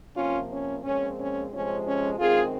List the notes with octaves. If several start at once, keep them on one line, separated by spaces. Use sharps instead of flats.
C3 F3 A#3 C#4 F4
C#4
A#2 F3 G#3 C4 C#4
C#4
F2 C3 F3 G#3 C4 C#4
C#4
F#2 D#3 G#3 C4 F4 G#4